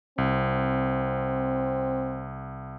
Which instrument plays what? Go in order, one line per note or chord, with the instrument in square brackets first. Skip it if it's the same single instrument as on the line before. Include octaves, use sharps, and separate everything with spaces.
[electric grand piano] C2 [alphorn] C4